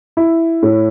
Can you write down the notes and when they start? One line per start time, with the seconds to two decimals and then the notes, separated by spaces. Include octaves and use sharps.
0.17 E4
0.63 A2